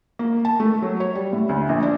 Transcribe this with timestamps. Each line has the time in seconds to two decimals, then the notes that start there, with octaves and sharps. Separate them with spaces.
0.19 A#3
0.45 A5
0.60 A3
0.82 F#3
1.00 C#5
1.15 G3
1.33 A2
1.49 D2
1.69 A#1
1.83 D4